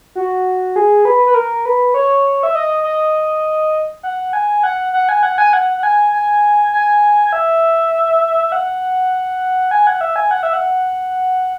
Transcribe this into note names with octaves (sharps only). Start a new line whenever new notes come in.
F#4
G#4
B4
B4
A#4
B4
C#5
E5
D#5
D#5
F#5
G#5
F#5
F#5
G#5
F#5
G#5
F#5
F#5
G#5
G#5
G#5
E5
F#5
G#5
F#5
E5
G#5
F#5
E5
F#5